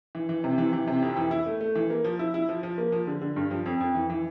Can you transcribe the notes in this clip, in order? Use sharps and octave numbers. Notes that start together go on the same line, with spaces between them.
E3
E3
C3
E3
E3
C3
F2
E3
E4
A3
A3
E3
A#3
F3
E4
E4
F3
F3
A#3
F3
D3
D3
G2
F3
F2
F2
E3
E3